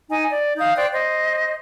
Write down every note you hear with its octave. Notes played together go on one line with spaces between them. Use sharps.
D#4 G#5
D5
D#4 F5 D#6 G6
C5 D5 G5 F#6
C5 D#5